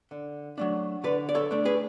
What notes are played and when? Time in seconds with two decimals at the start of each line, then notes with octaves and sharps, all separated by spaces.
0.11 D3
0.58 F#3 A3 D4
1.04 D3 B4 D5
1.29 D5
1.35 A4 C#5
1.51 A3 D4
1.65 G#4 B4